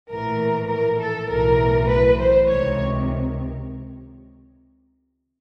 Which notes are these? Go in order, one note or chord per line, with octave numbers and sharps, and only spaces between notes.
A#1 A2 E3 A#4
A#4
A4
B1 A2 E3 A#4
B4
C5
C#2 C3 D#3 C#5